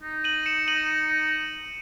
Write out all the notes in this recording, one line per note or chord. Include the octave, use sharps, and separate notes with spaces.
D#4
D#7 F#7
C#7 E7
D#7 F#7